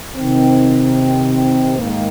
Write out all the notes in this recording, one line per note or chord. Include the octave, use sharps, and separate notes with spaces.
C3 D#3 C4
G#2 D#3 A#3